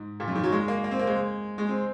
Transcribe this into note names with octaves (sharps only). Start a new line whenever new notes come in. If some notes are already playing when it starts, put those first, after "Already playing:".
Already playing: G#2
A#2
F#2
D#3
F#3
G#3
A#3
A#3
C4
A#3
G#3
G#3
C4